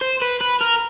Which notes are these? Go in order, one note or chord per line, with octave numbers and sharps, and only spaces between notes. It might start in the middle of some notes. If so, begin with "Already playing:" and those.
C5
B4
B4
A#4